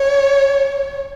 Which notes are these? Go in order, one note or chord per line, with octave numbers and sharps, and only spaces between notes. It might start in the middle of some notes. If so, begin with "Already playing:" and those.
Already playing: C#5